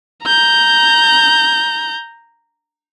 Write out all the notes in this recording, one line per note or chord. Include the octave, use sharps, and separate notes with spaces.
A#5 G6